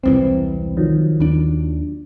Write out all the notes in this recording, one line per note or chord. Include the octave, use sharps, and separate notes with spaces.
E1 C2 E3 C4
D#3 F3 F#3
D#2 D4